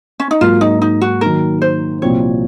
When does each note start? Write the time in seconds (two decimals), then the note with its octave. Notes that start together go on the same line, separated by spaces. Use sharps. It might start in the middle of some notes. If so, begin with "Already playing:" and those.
0.20 C#4
0.31 D#4
0.41 G#2 F#3 A#3 F4
0.61 D#4
0.82 D#4
1.01 F#4
1.21 D#3 F#3 A#3 D#4 A#4
1.62 C5
2.02 C2 A#2 F3 C4 F#4 C#5